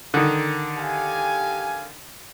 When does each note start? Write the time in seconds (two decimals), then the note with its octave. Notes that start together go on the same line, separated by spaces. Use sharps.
0.14 D3 D#3 D#4
0.77 G4 F5 G#5